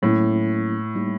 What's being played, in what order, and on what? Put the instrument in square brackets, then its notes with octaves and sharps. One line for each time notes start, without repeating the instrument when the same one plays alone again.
[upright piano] A2 [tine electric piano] F#3 A#3 C#4 E4
[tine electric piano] G3 A#3 D#4 G4